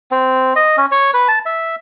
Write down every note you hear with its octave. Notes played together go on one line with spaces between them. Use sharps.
C4
D#5
C#4
C#5
B4
A5
E5